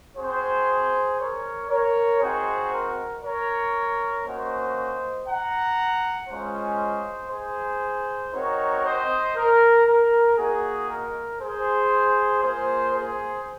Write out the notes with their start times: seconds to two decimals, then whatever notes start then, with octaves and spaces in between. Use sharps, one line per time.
0.16 C4 F#4 G#4 C5
1.19 A#4 C#5
1.70 A#4 C#5
2.21 C4 D#4 F#4 G#4 C5
2.72 A#4
3.23 A#4 C#5
4.25 A#3 C#4 F#4 C5 D#5
5.27 F#5 A#5
6.29 G#3 C#4 F4 C5 D#5
7.31 G#4 C5
8.33 C4 D#4 F#4 A#4 C#5
8.85 C5 D#5
9.36 A#4
9.87 A#4
10.38 A#3 D#4 F#4 G#4
10.89 A#4
11.40 G#4 C5
12.42 A#3 F4 G#4 C5
12.93 G#4 C5